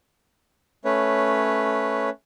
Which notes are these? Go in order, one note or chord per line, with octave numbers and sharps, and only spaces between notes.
A3 C#4 B4 C#5